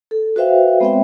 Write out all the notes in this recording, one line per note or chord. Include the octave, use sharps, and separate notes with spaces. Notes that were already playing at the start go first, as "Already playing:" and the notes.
A4
F#4 B4 C5 E5 F5 G5
G#3 B3 C4 C#5 E5 G5